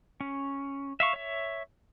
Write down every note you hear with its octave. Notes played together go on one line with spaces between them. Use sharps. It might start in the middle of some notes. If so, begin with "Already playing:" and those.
C#4
E5 F5 C#6
C#5 E5